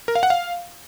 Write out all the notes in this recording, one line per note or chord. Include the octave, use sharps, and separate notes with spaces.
A#4
F5
F#5
F5